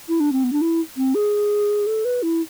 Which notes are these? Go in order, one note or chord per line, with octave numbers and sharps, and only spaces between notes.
E4
D4
C4
B3
D4
E4
C4
G#4
A4
B4
E4